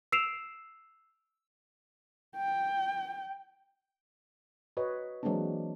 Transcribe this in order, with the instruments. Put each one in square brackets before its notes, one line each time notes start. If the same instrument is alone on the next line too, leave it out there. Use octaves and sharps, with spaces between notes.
[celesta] E6 C7 D7 E7 F7
[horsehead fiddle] G5
[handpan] F#4 B4 C#5 D#5
E3 F#3 G#3 A#3 C4 D4